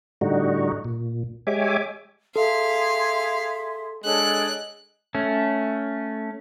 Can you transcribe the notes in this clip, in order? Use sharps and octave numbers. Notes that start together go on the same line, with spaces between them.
A2 D3 G3 D#4 F#4
A#2
G#3 G4 C#5 E5 G#5 D6
G#4 A4 E5 F5 C6
G#3 D4 A4 C#5 F#6
A3 C#4